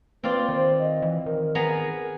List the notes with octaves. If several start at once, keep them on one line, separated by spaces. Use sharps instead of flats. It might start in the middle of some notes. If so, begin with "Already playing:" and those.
A#3 C4 F4 B4 D5
D#3 C5
D#5
E3
D#3 A#4
B3 G#4 A#5